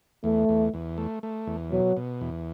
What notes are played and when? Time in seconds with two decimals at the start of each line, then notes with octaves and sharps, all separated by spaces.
0.24 E2 A3
0.49 E2
0.74 E2
0.98 A3
1.23 A3
1.47 E2
1.71 B2 F#3
1.97 B2
2.21 E2